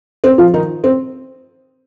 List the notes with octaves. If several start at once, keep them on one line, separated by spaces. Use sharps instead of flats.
C4
F3 F4
D#3 D#4
C4